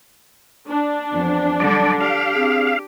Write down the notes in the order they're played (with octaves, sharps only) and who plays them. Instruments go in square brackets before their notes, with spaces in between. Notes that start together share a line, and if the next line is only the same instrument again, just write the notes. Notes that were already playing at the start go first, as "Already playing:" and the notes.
[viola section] D4
[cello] F2 [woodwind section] E3 F3 B3
[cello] D3 G3 [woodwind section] F#3 [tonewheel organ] D5
[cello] G4 [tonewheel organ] F5
[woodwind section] C4 G#4